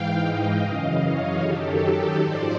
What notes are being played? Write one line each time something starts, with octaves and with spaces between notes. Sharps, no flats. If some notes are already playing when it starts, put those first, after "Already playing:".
Already playing: G#2 E3 F5 G5
D#5 F5
F#2 C#3 E3
C#5 D#5
F#2 D#3 F#3 G4 A4
G#2 F3 C5 D5